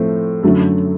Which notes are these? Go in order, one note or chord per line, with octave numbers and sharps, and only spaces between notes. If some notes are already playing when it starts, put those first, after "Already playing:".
Already playing: A2 F3 A3 C4
F#2 D3 F#3 A3